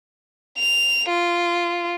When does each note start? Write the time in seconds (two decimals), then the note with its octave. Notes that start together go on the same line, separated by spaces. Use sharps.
0.58 F7
1.09 F4